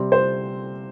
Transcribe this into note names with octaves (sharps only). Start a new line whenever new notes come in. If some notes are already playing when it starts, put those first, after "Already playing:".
Already playing: C3 G3 C4
C5